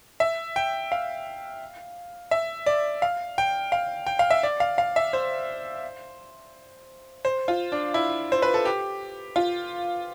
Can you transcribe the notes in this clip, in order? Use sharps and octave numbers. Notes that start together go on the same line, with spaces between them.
E5
G5
F5
E5
D5
F5
G5
F5
G5
F5
E5
D5
F5
F5
E5
C5
C5
F4
D4
E4
C5
B4
A4
G4
F4